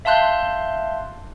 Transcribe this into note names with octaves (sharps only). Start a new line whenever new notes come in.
E5 F5 A5 C6 F#6 G6